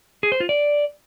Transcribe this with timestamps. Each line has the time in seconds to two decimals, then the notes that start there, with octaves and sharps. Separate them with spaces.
0.23 G#4
0.32 C5
0.40 F4
0.49 D5